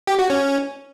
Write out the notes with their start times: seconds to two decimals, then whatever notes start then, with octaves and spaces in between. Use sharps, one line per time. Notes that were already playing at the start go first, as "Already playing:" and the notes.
0.07 G4
0.19 F#4
0.30 C#4